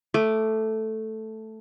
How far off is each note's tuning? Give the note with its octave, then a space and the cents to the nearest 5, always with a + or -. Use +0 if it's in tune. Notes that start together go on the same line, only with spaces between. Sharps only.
A3 +0 D6 +0